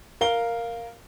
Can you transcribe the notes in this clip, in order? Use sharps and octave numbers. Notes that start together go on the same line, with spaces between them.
A#4 F5 G7